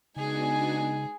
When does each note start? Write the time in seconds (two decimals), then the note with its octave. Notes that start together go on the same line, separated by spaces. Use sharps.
0.16 C#3 G#3 B3 D4 D#4 F#4 G#4 G#5